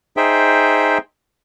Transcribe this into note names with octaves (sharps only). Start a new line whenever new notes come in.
D#4 G#4 C5 E5 G5